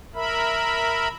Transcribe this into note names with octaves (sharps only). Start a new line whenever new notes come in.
A#4 E5 B5